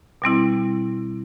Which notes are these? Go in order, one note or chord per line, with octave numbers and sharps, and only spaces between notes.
B2 G3 C4 E4